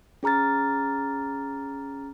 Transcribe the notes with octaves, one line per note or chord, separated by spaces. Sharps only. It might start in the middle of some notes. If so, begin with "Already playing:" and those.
C#4 G#4 A#5 F6 A6